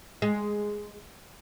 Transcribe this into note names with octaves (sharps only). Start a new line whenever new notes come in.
G#3